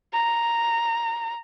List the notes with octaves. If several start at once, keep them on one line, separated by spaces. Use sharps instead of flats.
A#5